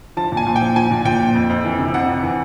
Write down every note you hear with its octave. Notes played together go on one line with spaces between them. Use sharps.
F3 A5
A#2
G#5
A#2
G5
F3
F3 G#5
A#2
A#2 G5
F3
F2
F2
E3
C3
F2 F#5
F2
E3